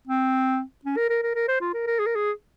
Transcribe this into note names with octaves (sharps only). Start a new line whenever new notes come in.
C4
C#4
A#4
A#4
A#4
A#4
C5
F4
A#4
A#4
G#4
A#4
G#4